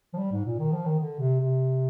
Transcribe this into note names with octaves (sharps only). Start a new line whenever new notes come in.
F3
G3
G#2
A#2
D#3
F3
D#3
D3
C3
C3